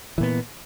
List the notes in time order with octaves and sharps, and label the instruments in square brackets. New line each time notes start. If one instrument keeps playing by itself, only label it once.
[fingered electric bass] E3
A#2
B3